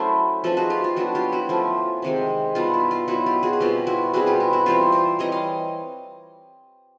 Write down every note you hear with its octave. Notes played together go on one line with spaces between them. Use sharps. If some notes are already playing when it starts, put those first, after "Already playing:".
Already playing: F#3 A3 C#4 E4 A#4 C5
F3 A3 C4 D#4 A4 B4
F#4 G#4
F4 G4
F4
F#3 B3 D4 E4 F#4
F4 G4
E4 F#4
F3 A3 C#4
C3 D#3 G#3 C4
B2 G3 B3 D#4 F4
E4
F4
F#3 B3 D#4 E4 F#4
F4 G4
F#4 G#4
G#4
B2 G3 C4 F4 G4
E4 F#4
B2 G3 C4 F#4 G#4
F4 G4
E4 F#4
E4 F#4
E3 G3 C4 E4 F4 G4
A#4 C5
E3 G3 C4 C#5 D#5
D#5 F5